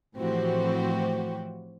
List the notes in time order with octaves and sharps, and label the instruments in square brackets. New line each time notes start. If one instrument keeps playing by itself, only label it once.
[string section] A2 E3 F3 C4 F#4 G4